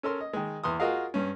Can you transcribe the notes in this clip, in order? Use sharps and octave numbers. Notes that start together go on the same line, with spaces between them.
C#4 A4 A#4 C6
D#5
D#3 G#3
E2 C6 D#6
F4 F#4 G#4 A#4 D#5 F5
G2 C#4